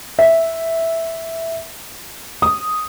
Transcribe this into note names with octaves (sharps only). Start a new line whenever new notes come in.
E5
D#6